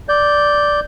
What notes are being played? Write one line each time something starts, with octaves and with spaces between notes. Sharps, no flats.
D5 G6